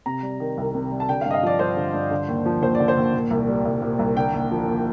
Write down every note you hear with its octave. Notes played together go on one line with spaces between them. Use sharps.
C3 A#5
G3
D#3
C2
C3
G3
A5
D3 G5
F5
G2
D#5
F5
F3 D5
G2 C5
D3
G2
D3
D#2
F3
D#2 C5
D3 D5
C5
D#2
A#2
C2
G3
C2
A#2
C2
D3 G5
D#2
F3
D#2